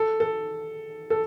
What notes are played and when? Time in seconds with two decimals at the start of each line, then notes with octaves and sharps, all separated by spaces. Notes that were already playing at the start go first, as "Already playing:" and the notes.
Already playing: A4
0.20 A4
1.10 A4